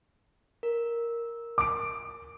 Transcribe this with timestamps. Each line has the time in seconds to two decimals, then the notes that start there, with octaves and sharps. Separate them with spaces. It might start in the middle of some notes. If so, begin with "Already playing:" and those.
0.63 A#4
1.58 D6 D7